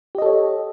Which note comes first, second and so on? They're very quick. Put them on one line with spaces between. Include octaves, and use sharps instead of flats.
G4 D#5 A4 C#5